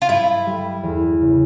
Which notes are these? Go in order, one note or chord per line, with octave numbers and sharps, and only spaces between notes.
F4
G2 E4
G3
E2
C#3